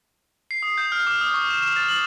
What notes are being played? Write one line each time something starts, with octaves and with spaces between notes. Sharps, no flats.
C7
D#6
G6
F6
D6
D#6
C#6
E7
E7
A6
F#7